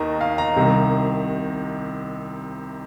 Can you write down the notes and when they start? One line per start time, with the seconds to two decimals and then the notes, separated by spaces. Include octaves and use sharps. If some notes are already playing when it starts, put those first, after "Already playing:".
Already playing: D#2 D#3 A#5
0.21 F5
0.38 A#5
0.56 C2 C3 D#3